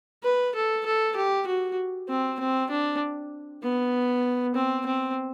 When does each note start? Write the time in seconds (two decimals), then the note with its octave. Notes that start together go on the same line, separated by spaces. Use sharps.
0.23 B4
0.55 A4
0.86 A4
1.16 G4
1.47 F#4
2.09 C4
2.39 C4
2.70 D4
3.63 B3
4.55 C4
4.86 C4